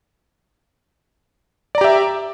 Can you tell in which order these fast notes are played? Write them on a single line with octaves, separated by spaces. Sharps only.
D5 A#5 G4 E5